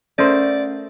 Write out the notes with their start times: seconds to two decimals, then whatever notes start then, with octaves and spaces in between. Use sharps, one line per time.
0.19 A3 C#4 A#4 C5 D5